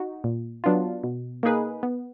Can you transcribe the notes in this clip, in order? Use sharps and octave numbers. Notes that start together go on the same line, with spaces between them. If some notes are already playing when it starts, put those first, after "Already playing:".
Already playing: D#4 F#4
A#2
F#3 B3 D4 F4
B2
A#3 D#4 G#4 B4
B3